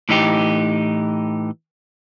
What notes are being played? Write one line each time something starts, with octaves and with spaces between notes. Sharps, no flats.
A2 E3 D#4 G4